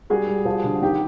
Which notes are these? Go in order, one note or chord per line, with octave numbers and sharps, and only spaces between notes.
G3 F#4 G#4
G3
F3
D3
D#3 G4